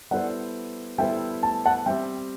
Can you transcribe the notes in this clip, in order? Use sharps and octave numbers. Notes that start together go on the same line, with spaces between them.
G3 B3 E4 A4 C5 D5 F#5
G3 B3 E4 A4 C5 E5 G5
A5
F#5 A5
G3 C4 G4 E5 G5